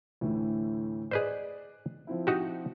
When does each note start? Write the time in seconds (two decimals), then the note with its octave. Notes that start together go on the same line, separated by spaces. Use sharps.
0.21 D2 A2 E3
1.11 G#4 B4 C5 D5 D#5 F#6
2.07 F3 C4 E4
2.27 D#4 F#4 G4